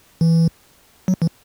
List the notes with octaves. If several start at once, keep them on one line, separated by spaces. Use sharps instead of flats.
E3
F#3
E3